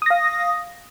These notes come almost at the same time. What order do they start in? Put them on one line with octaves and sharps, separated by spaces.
D#6 A#6 F5